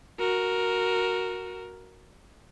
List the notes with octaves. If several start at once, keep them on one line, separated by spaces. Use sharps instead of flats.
F#4 A#4